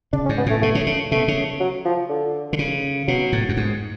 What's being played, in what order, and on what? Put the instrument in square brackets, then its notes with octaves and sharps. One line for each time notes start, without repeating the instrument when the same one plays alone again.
[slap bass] C#3 [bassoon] D4
[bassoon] C#4
[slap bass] G#2
[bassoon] B3
[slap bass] A2 [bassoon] A3
[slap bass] B2 [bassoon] A3
[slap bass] C#3
C#3
[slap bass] B2 [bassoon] A3
[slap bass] C#3
[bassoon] F#3
F3
D3
[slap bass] D3
C#3
[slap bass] B2 [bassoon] F#3
[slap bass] A2
F#2
G#2